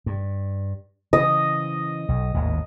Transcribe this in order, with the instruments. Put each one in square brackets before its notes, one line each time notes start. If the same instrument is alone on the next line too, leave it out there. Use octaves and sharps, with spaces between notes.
[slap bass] G2
[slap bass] C#3 E3 [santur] D#5
[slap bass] B1
G#1 D#2 A2